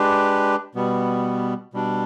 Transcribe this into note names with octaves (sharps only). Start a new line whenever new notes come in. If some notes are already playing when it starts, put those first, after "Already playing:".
Already playing: G#3 D4 G4 B4
B2 G3 B3
B2 G3 D4